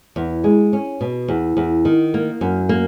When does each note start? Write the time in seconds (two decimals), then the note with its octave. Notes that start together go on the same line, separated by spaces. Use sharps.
0.16 E2
0.44 G#3
0.73 C#4
1.01 B2
1.28 E2
1.57 E2
1.85 D#3
2.14 A#3
2.41 F#2
2.69 A#3